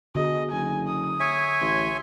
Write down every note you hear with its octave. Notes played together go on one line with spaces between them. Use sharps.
B2 D3 G#4 D#5
F#1 G#5
D#6
C#5 E5 G#5
A1 C6